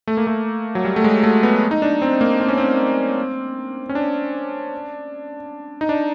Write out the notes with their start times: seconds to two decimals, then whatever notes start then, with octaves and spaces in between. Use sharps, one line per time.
0.07 A3
0.17 A#3
0.27 A3
0.75 F#3
0.85 G3
0.96 A3
1.04 G#3
1.23 A3
1.43 B3
1.71 D#4
1.82 D4
2.02 C4
2.21 A#3
2.40 C4
2.48 C#4
2.57 C4
3.89 C#4
3.95 D4
5.81 D#4
5.89 D4